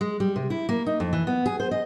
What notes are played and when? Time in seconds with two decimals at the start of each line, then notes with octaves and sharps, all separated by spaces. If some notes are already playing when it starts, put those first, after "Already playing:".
0.01 G#3
0.20 G3
0.36 C3
0.50 E4
0.69 A#3
0.86 D#4
1.00 F2
1.13 E3
1.27 B3
1.46 G#4
1.60 C5
1.71 D#5